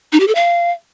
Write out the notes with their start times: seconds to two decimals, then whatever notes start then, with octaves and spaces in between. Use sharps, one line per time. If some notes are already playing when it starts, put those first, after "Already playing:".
0.12 D#4
0.20 G4
0.28 A4
0.35 F5